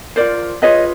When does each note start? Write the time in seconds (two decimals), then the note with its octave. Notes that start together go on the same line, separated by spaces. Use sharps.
0.16 F4 A#4 C5 D5
0.62 F4 G#4 B4 C#5 D#5